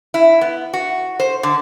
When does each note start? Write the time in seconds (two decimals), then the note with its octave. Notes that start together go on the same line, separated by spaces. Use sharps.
0.14 E4
0.41 B3
0.73 F#4
1.20 C5
1.43 D3